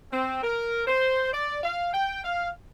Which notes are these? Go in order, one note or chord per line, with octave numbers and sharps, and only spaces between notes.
C4
A#4
C5
D5
F5
G5
F5